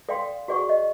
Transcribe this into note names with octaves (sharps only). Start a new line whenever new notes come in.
A4 D5 F5 G5 C6
F#4 G#4 D5 F#5 C#6
D#5